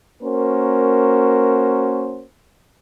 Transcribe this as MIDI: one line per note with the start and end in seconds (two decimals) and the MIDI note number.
0.21 2.23 58
0.21 2.23 61
0.21 2.23 66
0.21 2.23 70
0.21 2.23 72